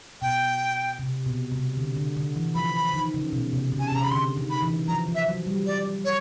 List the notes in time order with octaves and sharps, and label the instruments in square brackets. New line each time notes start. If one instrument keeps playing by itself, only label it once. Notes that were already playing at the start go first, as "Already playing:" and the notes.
[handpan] B2 [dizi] G5
[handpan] C3
B2
C3
D3
D3
D3
E3
[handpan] F3 [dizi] B5
[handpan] D#3
C#3
B2
C3
C#3
[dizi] G#5
A5
[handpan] C3 [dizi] A#5
[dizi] B5
[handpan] D3 [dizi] C6
[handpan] D#3
[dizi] B5
[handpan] E3
[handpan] F3 [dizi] A#5
[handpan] F3
[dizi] E5
[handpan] F#3
G3
[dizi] D5
C#5